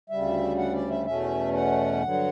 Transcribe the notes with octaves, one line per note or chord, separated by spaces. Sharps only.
D2 C#3 G3 E5
F#5
D5
E5
E2 B2 A3 C#4 E5
F#5
G2 D3 F#3